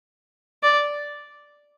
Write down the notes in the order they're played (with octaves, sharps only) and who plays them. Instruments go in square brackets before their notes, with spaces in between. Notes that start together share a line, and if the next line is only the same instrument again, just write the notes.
[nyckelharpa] D5